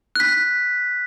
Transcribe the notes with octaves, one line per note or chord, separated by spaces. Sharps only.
F#6 B6